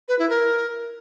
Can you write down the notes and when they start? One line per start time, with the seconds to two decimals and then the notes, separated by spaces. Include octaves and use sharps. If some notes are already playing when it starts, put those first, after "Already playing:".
0.08 B4
0.19 E4
0.29 A#4